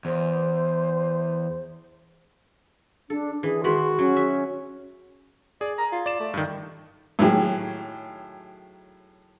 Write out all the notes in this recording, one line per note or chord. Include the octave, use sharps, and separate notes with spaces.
E2 C5
D4 A4
E3 G#4
D#3 G#3 F#4 B5 C6
F#3 C#4
E5
G#4 D5
A#5
F4
D5 E7
A3
G2 D#3
A2 D#3 F#3 G4 G#4